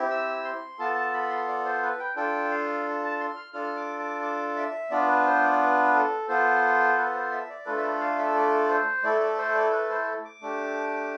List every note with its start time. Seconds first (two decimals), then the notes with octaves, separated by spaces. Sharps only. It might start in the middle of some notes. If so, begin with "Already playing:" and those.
Already playing: C4 E4 G4
0.10 E6
0.44 C6
0.79 B3 F4 A4 A5
0.95 A5
1.14 B5
1.30 C6
1.48 D5
1.65 C5
1.82 B4
1.99 G5
2.16 D4 F4 A4 G5
2.51 F5
3.03 A5
3.20 C6
3.36 F6
3.54 D4 F4 A4 F6
3.76 D6
3.99 D6
4.23 D6
4.56 E5
4.91 B3 D4 F4 D5
5.08 B4
5.26 C5
5.43 D5
5.60 B4
5.94 A4
6.29 B3 F4 A4 C5
6.98 B4
7.14 C5
7.32 E5
7.50 D5
7.66 A3 D4 F4 A4 B4
7.78 E5
7.84 D5
8.00 F5
8.18 E5
8.35 D5
8.69 C5
9.03 A3 E4 A4 D5
9.21 D5
9.37 C5
9.55 D5
9.72 B4
9.90 C5
10.25 D6
10.41 A3 D4 G4